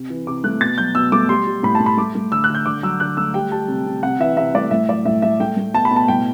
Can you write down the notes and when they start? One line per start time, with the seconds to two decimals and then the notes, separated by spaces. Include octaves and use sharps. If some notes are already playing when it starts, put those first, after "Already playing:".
Already playing: C3
0.10 E3
0.27 C3 D6
0.44 A3 F#6
0.61 B2 A6
0.78 F#3 G6
0.95 B2 E6
1.12 A3 D6
1.29 G3 C6
1.47 G3
1.63 A2 B5
1.75 A5
1.81 A2
1.86 B5
1.97 A3 D6
2.15 A3
2.32 D3 E6
2.44 F#6
2.50 D3
2.55 G6
2.66 D3 D6
2.83 F#3 E6
3.00 D3 F#6
3.17 A3 E6
3.34 G3 G5
3.52 G3 A5
3.68 C3
3.86 C3
4.03 C3 F#5
4.20 E3 E5
4.37 C3 E5
4.54 A3 D5
4.71 A2 E5
4.89 F#3 D5
5.05 A2 E5
5.22 A3 E5
5.40 A3 G5
5.57 A3
5.74 B2 A5
5.85 B5
5.91 B2
5.96 A5
6.08 A2 G5